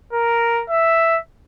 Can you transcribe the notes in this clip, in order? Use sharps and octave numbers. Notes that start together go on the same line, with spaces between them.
A#4
E5